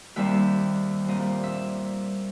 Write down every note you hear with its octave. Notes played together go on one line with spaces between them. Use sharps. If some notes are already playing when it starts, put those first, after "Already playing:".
D#2 D#3 G3 C4 E5
A#2 G3 C4 D#5
E5